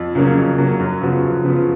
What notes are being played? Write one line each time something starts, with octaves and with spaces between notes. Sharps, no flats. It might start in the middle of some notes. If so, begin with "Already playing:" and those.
Already playing: F2
C#3 F#3 A#3 C#4
F2
C#3 F#3 A#3 C#4
F#2
C#3 F3 B3 F#4
F#2
C#3 F3 B3 F#4